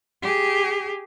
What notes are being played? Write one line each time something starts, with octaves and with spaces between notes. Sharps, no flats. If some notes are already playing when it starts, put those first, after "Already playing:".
G4 G#4